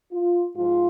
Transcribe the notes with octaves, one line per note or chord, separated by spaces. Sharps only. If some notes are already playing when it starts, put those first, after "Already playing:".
F4
G#2 F3 F4